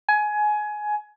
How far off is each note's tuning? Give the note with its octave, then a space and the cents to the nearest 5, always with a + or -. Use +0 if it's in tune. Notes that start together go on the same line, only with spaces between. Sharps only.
G#5 +20